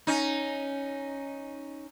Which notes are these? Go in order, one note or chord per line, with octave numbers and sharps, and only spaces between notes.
C#4 D#4